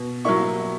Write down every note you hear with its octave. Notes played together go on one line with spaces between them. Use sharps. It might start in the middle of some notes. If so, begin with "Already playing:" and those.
Already playing: B2
F#3 A#3 E4 C#6